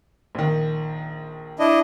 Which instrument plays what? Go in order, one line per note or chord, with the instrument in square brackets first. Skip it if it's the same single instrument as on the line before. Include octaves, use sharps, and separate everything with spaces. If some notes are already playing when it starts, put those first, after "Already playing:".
[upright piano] A#1 D#3
[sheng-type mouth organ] D4 E4 D#5